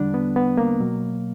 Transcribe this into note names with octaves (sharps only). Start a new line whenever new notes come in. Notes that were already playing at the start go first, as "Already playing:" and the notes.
Already playing: E2 D3 G3 D4
B3
B3
A#3
B2 F#3